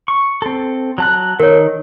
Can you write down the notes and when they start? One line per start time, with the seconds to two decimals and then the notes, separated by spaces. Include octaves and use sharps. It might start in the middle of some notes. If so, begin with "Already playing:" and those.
0.08 C#6
0.42 C4 A4
0.98 F#3 A5 F#6
1.40 D#3 A#4 C#5